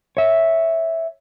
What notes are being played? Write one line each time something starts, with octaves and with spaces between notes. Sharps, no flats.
C#5 E5